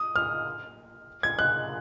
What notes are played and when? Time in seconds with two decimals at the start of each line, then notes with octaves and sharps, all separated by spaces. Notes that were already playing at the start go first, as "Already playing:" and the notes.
Already playing: D#6
0.16 F6
1.23 G#6
1.39 F#6